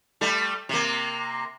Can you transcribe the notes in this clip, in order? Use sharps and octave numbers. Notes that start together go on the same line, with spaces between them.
G3 A3
C3 A#3